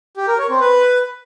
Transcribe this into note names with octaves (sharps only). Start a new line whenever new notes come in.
G4
A#4
C#5
C4
B4